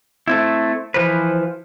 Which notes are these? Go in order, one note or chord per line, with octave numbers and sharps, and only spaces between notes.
A3 C4 E4
E3 F3 B4 C5